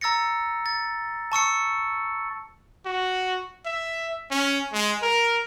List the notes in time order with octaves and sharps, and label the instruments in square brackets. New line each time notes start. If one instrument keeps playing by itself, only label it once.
[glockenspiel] A#5 E6 A6 A#6 C#7
A6
A5 C#6 E6 C#7
[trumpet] F#4
E5
C#4
G#3
A#4